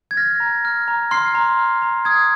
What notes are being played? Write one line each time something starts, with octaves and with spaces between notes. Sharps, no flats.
G#6
F6 A#6
A#5
F6
A#5
C6 F6 C7
A#5
F6
A#5
D#6 G#6